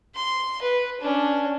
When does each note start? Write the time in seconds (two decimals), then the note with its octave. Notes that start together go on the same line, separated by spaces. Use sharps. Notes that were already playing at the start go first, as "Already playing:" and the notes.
0.15 C6
0.62 B4
1.01 C#4 D4